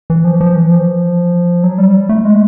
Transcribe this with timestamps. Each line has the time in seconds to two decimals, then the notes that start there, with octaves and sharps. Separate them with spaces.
0.10 E3
0.24 F3
0.41 F3
0.56 E3
0.71 F3
1.64 F#3
1.78 G3
2.09 A3
2.25 G#3